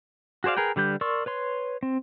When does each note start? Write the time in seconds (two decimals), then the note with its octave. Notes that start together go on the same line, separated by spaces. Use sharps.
0.44 F#4 G#4 C5 D5 F5
0.57 G#4 A#4 B4 G5
0.76 D3 G3 B4 G6
1.01 A#4 D5 C6 C#6 E6
1.26 B4 C#5 C6
1.83 C4